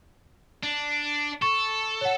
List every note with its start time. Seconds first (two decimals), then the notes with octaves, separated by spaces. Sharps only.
0.63 D4
1.42 A4 C#6
2.01 C#5 F#5